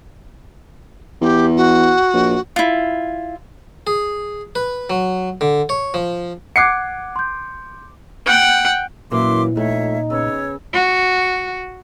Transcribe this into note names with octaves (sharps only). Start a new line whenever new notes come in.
E2 G4
F#4
A#1
E4 F4
G#4
B4
F#3
D3
C#5
F3
F#5 D6 F#6 G#6 C7 C#7
C6 G6
F#5 G5
F#2 A#2 E3 F#3 A#3 E5 C6 D6
F2 A3 D#4 C#5 E5
C#3 B3 C#4 C#5 E6
F#4